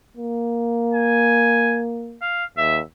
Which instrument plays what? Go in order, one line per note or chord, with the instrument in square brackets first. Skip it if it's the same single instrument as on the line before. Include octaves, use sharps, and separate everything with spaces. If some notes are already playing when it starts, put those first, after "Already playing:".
[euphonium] A#3
[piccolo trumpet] G#5
F5
[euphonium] D#2 [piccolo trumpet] E5